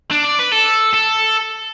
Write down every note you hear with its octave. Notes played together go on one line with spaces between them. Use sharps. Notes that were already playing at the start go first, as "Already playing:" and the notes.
D4
D5
B4
A4
A4